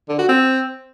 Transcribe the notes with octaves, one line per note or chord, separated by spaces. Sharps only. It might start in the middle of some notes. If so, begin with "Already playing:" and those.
D3
F#4
C4